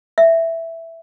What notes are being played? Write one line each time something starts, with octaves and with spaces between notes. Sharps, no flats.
E5